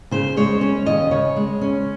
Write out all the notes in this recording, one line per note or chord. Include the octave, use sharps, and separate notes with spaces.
C#3 C5
G#3 C#5
C#4 C#5
D#2 D#5
C#3 C#5
G#3
C#4